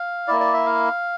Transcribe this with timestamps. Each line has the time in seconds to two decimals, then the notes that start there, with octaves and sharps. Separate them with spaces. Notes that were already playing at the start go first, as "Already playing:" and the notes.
Already playing: F5
0.28 A#3 E4 D5
0.40 D5
0.53 E5
0.66 F5